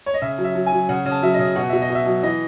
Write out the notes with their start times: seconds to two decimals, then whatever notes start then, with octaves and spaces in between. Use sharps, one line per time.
0.06 C#5
0.14 D#5
0.22 C#3 E5
0.38 F#3
0.44 E5
0.55 F#3
0.66 G#5
0.72 F#3
0.89 C#3 F#5
1.06 C#3
1.11 A5
1.22 F#3 E5
1.34 D#5
1.39 C#3
1.56 B2 F#5
1.69 B2 E5
1.82 D#5
1.90 B2
1.95 E5
2.06 F#3
2.23 E3 D#5